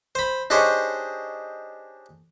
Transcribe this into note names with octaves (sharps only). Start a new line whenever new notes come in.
C5 B5
D4 D#4 G4 G#4 C5 C#5